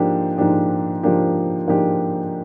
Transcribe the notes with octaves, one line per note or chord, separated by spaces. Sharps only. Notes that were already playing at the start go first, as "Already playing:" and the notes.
Already playing: G#2 F3 A#3 D4 G4
G#2 F3 A#3 D4 G4
G#2 F3 A#3 D4 G4
G#2 F3 A#3 D4 G4